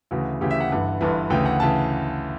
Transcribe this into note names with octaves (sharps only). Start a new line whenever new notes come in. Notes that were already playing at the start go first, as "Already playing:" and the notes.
D2 C#3 E3 F#4
D2 C#3 E3 G4
E5
F#5
G1 G2 E3
G1 G2 E3
D2 C#3 E3 G5
F#5
C#3 E3 A5